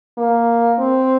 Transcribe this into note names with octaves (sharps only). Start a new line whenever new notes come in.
A#3
C4